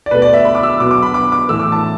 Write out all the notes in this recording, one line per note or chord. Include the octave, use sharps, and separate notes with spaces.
D5
B2 A3 B4
D5
E5
B5
D6
E6
B2 F#3 B3 D6
D6
B5
D6
D6
A2 E3 A3 E6
D6
A5